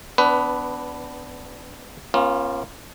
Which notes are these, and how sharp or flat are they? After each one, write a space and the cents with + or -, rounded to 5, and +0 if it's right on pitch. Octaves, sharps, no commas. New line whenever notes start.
B3 +25 D4 -10 B4 +5
A#3 +40 C#4 -30 F4 -10